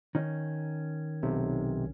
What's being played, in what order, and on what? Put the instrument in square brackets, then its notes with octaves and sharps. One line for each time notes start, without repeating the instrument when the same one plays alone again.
[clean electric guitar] D#3 C#4
[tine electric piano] B1 C3